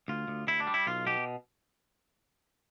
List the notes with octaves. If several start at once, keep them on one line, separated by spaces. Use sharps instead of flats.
D2 F4
D2
D2 E4
D4
G3
E4
B1 F4
B2 G4